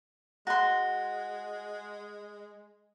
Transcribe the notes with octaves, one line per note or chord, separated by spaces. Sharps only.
G#3 F#4 C6